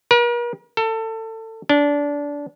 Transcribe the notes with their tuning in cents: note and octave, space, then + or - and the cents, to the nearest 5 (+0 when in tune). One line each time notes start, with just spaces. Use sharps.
A#4 +45
A4 +25
D4 -20